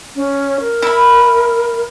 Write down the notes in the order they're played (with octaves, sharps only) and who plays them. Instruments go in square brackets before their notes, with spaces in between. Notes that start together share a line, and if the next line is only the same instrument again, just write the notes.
[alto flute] C#4
A#4
[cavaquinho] E4 B5